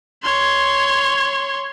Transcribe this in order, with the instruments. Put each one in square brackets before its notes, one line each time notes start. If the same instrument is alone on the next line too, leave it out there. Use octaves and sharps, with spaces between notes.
[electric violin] C#5 C6